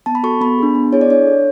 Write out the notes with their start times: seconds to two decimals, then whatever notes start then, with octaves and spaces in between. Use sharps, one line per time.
0.06 B3 A5
0.15 B5
0.23 F#4 A4 C#6
0.41 B3 B5
0.59 D4 G#4
0.75 B3
0.92 E4 G#4 C#5
1.01 D5
1.09 D4 C#5
1.27 A4